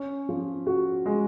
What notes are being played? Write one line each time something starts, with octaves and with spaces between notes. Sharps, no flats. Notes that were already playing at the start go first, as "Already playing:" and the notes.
Already playing: C#4
F3
F#4
G#3